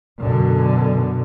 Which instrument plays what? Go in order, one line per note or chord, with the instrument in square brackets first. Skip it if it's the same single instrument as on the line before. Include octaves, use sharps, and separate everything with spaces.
[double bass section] F#2 B2 D3